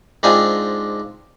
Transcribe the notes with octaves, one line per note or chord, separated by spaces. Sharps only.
G#2 C4 D4 D#4 F4 G#5